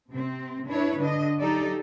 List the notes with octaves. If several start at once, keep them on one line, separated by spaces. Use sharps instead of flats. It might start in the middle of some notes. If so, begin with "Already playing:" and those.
C3 C4
D4 E4 B4 C#5
D3 D4 D#5
F#3 D#4 G4 A4 D5